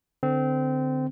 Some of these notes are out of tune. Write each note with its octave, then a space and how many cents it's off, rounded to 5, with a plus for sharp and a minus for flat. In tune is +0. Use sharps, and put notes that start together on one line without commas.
D3 +5 C4 -20